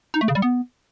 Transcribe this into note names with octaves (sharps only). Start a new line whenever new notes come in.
D#4
A3
C#3
G3
B3